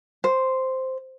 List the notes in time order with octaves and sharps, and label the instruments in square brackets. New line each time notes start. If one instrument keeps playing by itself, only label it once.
[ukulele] C5